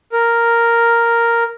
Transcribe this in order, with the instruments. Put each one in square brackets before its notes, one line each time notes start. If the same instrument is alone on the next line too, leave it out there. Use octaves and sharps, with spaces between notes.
[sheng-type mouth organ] A#4